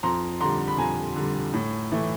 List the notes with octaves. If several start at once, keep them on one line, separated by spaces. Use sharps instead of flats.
F2 A#5 C6
D3 G3 A#5 C6
B5
F2 G#5 A#5
D3 G3
A2
E3 A3